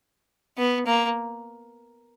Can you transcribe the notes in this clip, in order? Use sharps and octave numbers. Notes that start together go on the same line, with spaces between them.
B3
A#3